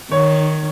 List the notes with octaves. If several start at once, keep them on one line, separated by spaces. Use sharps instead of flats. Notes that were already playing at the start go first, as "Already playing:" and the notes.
D#3 C#5